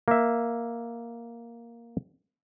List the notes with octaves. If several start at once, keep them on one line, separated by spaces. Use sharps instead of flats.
A#3 E5